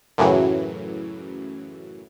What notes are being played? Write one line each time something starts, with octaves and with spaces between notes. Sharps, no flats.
F#2 A2 C#3 E3 F#3